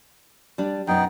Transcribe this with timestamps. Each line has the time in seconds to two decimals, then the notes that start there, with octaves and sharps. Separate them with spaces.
0.58 G3 D4
0.87 F#2 B2 B3 D#4 G5